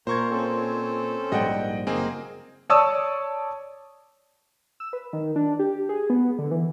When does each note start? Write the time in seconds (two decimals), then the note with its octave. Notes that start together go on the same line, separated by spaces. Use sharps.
0.07 A#2 A#4 C5 C#6 G#6
0.31 C4 C#4 A4
1.32 A#1 G#2 G3 D#5 F#5 G5
1.87 F#1 A#3 C4 G#4 D#5
2.70 C#5 D5 A5 C#6 D#6 E6
4.80 E6
4.93 B4
5.13 D#3
5.36 D4
5.59 G4
5.89 G#4
6.10 B3
6.39 D3
6.51 E3